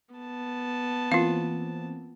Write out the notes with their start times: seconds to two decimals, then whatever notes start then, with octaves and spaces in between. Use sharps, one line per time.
0.15 B3 A5
1.12 E3 A#3 C4 F4 F5